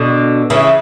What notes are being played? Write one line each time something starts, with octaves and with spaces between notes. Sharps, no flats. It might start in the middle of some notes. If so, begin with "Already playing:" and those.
Already playing: B2 D3
C#3 E3